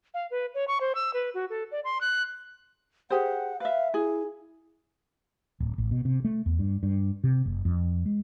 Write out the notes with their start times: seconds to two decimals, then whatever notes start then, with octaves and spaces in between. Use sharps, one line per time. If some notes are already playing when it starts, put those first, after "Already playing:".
0.14 F5
0.31 B4
0.54 C#5
0.68 C#6
0.81 C5
0.95 E6
1.13 B4
1.34 F#4
1.50 A4
1.72 D5
1.84 C6
2.01 F#6
3.10 G4 G#4 C5 F#5
3.60 B4 E5 F5
3.94 E4 G#4
5.60 D1
5.78 A1
5.91 B2
6.05 C3
6.25 A3
6.46 E2
6.59 G2
6.83 G2
7.24 C3
7.46 F#1
7.65 F2
8.06 G#3